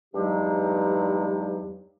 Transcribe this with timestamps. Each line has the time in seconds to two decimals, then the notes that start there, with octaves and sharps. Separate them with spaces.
0.14 E2 G2 F#3 G#3 D#4 G4